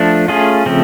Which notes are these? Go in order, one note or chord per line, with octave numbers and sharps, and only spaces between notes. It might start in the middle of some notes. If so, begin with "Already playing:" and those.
Already playing: F3 A3 D4
A3 C#4 F4 G#4
C#3 F3 A3 C4